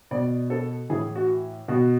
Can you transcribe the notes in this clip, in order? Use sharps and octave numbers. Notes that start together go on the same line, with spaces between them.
B2 D5
A4
A2 E3 G#4
F#4
B2 F#4